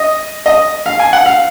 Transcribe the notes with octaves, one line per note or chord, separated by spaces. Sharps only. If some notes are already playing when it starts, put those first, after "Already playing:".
Already playing: D#5
D#5
F5
G#5
F#5
F5